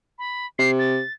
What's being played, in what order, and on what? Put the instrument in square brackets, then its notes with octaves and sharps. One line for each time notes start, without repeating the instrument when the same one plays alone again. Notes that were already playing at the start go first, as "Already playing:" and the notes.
[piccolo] B5
[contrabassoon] C3 [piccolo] C7
[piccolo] A6